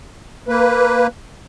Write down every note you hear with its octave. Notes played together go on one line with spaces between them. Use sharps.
A#3 B4